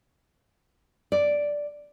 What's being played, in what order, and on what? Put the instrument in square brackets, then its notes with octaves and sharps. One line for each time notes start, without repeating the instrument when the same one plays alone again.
[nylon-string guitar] D5